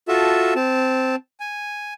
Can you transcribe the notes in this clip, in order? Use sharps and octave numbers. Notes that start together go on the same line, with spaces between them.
F4 F#4 A4 E5 A5
C4 A5
G#5